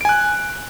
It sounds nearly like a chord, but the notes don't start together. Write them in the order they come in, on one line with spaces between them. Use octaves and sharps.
D7 G#5 F#6